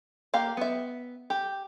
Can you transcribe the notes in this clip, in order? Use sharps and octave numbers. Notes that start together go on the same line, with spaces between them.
A#3 G4 F5
B3 E5
G4